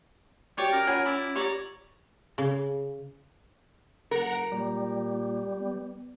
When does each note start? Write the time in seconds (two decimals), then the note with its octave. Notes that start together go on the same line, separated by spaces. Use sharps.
0.58 F#4 G4 C#5 D5
0.72 C#4 A#4
0.87 F4 C#5 F#5 G#5
1.06 E4 D5
1.36 G4 C#5 D5 A#5
2.38 C#3
4.11 F#1 A#4 F#5 A#5
4.52 A#2 G3
5.61 B3